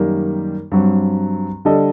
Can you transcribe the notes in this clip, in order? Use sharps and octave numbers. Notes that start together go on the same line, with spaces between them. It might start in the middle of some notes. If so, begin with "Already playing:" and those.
Already playing: F#2 D#3 G3 A#3
G2 F#3 C4
D3 G3 D4 A4 D#5